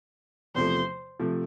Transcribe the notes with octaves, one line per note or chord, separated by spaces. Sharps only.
E2 C3 F3 A3 C5
C3 F3 A3